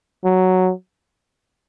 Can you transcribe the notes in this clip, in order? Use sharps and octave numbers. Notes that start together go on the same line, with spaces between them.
F#3